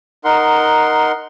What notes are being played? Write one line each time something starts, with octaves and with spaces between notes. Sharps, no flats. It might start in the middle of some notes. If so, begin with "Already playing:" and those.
D#4 A#4 F#5 C6